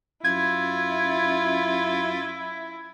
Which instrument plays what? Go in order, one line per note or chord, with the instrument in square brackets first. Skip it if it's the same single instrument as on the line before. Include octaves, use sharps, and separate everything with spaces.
[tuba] F#2 [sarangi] E4 [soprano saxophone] F4 [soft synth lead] G#6